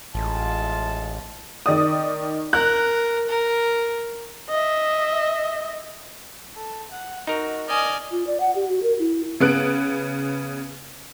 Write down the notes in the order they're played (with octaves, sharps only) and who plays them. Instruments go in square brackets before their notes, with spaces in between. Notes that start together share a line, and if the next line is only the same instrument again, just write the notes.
[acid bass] A1 [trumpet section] G#3 F4 A5
[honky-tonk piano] D#3 D5 D#6
[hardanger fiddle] A#4 [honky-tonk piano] F#6
[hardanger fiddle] A#4
[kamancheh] D#5 E5
[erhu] A4
F#5
[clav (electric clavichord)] D#4 A#4 [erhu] F#4
[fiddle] D5 G#5 [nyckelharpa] D#5 [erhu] F6
[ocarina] F4
D5
F#5
G4
F#4
A#4
E4
[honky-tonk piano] C#3 B3 F#6 D7